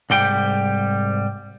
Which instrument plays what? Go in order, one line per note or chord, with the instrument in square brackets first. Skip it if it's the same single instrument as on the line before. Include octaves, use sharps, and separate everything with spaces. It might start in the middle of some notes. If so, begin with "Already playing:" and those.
[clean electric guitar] C2 G#2 G3 G5